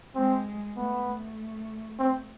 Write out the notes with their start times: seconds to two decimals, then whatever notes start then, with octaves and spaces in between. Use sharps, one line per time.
0.15 G#3 C4
0.76 A3 B3
1.07 A3
1.99 C4